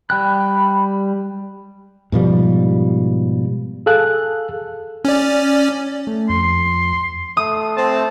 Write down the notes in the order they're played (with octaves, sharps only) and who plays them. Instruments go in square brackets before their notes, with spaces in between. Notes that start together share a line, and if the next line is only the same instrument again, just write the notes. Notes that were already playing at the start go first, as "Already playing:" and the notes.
[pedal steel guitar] G3 G5 F#6 [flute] B5
[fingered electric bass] G#2 B2 F3 G3
[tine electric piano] G#4 A4 F5 F#6
[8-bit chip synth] C#4 D5
[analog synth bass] A3
[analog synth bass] F2 [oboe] C6
[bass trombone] A3 [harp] D#6
[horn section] C4 A5